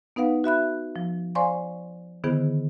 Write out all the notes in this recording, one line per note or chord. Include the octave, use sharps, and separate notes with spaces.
B3 D#4 B4 F5 F#5
F#4 E5 B5 F#6
F3
C5 D5 F5 G#5 C6 C#6
D3 D#3 B3 E4 G#4 C5